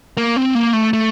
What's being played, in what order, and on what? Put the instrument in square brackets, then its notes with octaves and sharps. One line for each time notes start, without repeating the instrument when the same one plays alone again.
[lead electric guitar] A#3
C4
A#3
A3
A3